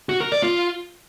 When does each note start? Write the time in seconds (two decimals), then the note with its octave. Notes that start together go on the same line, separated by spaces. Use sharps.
0.09 F#4
0.20 A#4
0.32 D5
0.43 F4